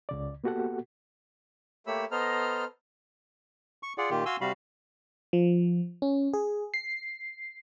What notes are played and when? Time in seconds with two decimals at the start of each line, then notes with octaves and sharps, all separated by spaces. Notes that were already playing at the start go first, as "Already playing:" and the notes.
0.09 C#2 C#3 D5
0.44 A#3 B3 F#4 G4 A4 F#5
1.87 A3 A#3 G4 C#5 B5 E6
2.11 B3 A4 C5 D#5 A#5 F6
3.83 C#6
3.98 F4 G#4 D5 F#5
4.10 A#2 D#3 F4 G4
4.26 F#4 F5 G#5 C6 E6
4.41 C3 G3 F#4 F5 B5
5.33 F3
6.02 C#4
6.33 G#4
6.74 C7